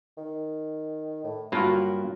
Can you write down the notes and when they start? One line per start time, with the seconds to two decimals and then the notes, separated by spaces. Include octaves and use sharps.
0.18 D#3
1.24 A2
1.52 G2 F#3 A#3 F4 F#4 A#4 B5